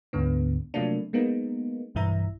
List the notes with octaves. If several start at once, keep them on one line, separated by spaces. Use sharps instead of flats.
D2 G#2 D3 B3
C3 F3 F#3 A3 A#3 D4
G#3 A#3 B3 D#4
B1 G2 E3 E4 E5 A#5